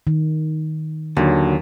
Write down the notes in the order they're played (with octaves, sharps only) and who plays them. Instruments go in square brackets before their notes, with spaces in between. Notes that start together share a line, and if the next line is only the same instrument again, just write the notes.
[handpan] D#3
[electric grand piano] D#2 F#3 [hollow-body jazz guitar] D3